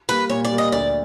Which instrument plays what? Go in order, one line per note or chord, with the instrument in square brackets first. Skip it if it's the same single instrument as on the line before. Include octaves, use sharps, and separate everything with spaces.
[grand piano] G3 A#3 [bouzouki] B4
[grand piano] A#2 [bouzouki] C#5
[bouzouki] D5
[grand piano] G3 A#3
[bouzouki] D#5
[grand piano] D2 [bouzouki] D5